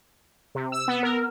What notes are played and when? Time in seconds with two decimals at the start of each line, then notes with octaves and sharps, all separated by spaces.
0.55 C3
0.72 E6
0.88 B3
1.03 A#4